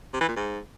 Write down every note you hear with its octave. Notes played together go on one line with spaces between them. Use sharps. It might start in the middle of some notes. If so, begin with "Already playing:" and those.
C3
E3
A#2
G#2